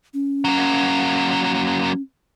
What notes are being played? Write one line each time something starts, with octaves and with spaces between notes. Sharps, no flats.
C#4
F#3 A#3